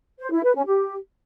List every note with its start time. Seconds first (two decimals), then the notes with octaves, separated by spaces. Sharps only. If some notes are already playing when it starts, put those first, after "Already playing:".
0.20 C5
0.32 E4
0.43 B4
0.55 C#4
0.66 G4